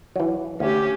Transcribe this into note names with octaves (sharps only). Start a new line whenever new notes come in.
E3 F#3
D2 C#4 G4